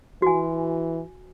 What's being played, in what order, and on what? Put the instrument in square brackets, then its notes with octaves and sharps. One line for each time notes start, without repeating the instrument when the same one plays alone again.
[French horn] E3 [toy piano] F#4 G#5